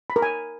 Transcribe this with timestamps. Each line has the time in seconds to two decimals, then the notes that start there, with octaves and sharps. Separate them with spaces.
0.10 B5
0.16 A#4
0.22 G#5